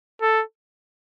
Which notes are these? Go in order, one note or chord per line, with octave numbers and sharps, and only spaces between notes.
A4